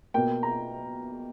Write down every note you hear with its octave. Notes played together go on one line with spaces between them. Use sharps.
B2 A#3 G5
A#5